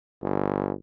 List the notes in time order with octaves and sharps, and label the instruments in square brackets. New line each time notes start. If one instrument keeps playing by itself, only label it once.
[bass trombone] G1